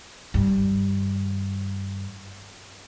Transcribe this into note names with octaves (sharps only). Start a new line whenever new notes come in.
G2 D#3